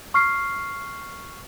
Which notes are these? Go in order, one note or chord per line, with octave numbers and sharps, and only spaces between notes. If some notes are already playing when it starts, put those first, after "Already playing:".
C#6 F6 C7